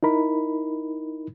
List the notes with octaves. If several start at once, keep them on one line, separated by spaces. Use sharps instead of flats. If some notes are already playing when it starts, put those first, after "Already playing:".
D#4 E4 A#4 B5